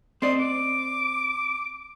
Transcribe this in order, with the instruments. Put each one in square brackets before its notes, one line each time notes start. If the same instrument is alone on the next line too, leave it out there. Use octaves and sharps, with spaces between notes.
[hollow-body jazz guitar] C4 D5 D#5 [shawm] C6
[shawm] D6